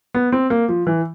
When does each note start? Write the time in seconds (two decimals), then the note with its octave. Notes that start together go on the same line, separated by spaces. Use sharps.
0.14 B3
0.32 C4
0.50 A#3
0.69 F3
0.87 E3